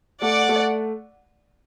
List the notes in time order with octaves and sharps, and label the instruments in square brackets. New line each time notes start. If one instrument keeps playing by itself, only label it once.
[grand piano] A3 [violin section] D5 F#5
[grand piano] A3